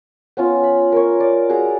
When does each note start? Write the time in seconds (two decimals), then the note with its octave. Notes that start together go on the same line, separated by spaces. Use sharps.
0.37 B3 C#4 F4
0.63 B5
0.92 A#4 C#5
1.20 D5
1.49 F#4 G#4 D5 A#5